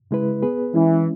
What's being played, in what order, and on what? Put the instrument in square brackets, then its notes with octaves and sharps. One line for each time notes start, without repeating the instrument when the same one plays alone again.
[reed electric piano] C#3 G#3 E4 B4
B3 G#4 B4
[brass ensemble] E3 [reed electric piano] G#3 C#4 E4